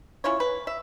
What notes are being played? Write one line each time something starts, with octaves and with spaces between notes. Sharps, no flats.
C#4 E4 F4 C#5
B4
E5